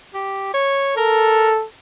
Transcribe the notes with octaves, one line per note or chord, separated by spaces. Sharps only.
G4
C#5
A4 A#4